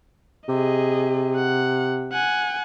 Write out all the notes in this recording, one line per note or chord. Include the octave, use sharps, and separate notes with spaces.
C3 G#4 D#5
F#5
F#5 G#5